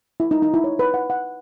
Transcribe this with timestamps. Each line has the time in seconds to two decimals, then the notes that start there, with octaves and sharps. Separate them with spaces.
0.20 E4
0.31 D#4
0.42 D#4
0.54 E4
0.64 C#5
0.79 B4
0.94 F#5
1.10 F#5